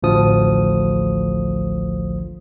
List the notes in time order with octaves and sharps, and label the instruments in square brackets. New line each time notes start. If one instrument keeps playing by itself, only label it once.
[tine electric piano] A1 D2 F3 D#6